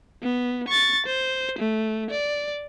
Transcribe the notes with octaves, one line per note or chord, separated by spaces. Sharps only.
B3
C#6 A6
C5
A3
D5